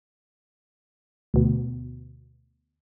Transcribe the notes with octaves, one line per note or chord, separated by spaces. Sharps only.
D2 B2